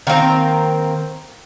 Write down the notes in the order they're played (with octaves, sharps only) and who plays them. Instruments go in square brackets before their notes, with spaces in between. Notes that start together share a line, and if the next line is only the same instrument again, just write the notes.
[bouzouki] D#3 A#3 C4 A#5